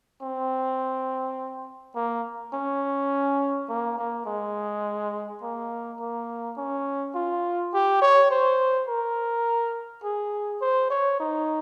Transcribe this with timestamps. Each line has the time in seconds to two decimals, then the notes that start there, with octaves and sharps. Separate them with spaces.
0.22 C4
1.96 A#3
2.54 C#4
3.69 A#3
3.98 A#3
4.26 G#3
5.43 A#3
6.00 A#3
6.58 C#4
7.15 F4
7.74 G4
8.02 C#5
8.31 C5
8.88 A#4
10.04 G#4
10.61 C5
10.90 C#5
11.20 D#4